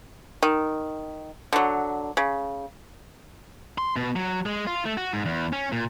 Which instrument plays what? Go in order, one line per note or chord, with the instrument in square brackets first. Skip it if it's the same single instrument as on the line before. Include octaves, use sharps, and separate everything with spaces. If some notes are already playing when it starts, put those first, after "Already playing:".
[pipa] D#3
D3 F#3
C#3
[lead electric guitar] C6
B2
F#3
G#3
F4
A3
F#4
G#2
E2
C#4
A#2